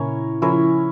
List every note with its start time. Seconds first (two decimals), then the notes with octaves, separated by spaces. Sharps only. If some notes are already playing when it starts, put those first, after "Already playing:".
Already playing: A#2 C#3 C#4 E4 A#4 C#5
0.42 C#3 F3 C#4 E4 A#4 C#5